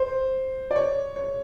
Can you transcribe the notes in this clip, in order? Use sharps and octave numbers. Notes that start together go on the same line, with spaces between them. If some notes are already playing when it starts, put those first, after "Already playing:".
Already playing: C5
D5
C#5
C#5